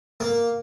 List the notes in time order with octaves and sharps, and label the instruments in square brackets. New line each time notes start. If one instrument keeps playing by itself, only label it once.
[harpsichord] A#3